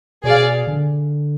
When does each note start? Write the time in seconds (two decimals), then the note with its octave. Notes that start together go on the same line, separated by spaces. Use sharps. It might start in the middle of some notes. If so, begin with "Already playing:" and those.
0.24 B2 G#4 D5 F5
0.67 D3